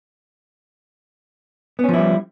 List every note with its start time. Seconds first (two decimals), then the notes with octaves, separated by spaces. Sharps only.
1.79 B3
1.84 C#4
1.89 F3
1.94 E4
1.98 G3